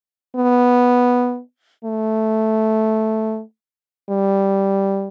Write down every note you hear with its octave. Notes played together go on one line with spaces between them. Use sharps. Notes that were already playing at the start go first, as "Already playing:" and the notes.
B3
A3
G3